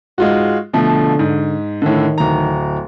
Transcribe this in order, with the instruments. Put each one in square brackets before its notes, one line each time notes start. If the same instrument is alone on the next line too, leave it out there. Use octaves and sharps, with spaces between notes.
[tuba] G#2 [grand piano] G#3 F4 F#4
[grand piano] B2 F3 A3 [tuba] D3
[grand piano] G#2
[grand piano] A2 D3 [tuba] D#3
[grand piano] D1 A#5